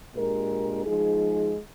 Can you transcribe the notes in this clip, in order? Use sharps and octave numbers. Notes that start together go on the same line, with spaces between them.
A#2 G#3 D4 G4 A#4
F3 G#3 D#4 G#4